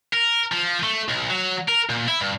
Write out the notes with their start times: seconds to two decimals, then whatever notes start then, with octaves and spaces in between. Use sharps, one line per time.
0.13 A#4
0.52 F3
0.83 A3
1.08 B1
1.30 F#3
1.68 A#4
1.89 A#2
2.08 E4
2.21 G2